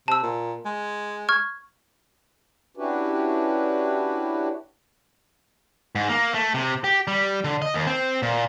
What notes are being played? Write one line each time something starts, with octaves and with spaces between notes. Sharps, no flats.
C3 A5 E6
A#2
G#3
C#6 F6 G#6
C#4 D4 E4 F#4 G4 B4
G#2
A#3
A3
C3
G4
G3
D3
D#5
D#2
C4
A#2